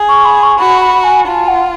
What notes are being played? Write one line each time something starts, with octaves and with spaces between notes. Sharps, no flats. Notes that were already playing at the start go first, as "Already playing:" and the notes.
Already playing: G#4
C#6
B5
C#6
F#4 B5
B5
G#5
F4 A5
F#5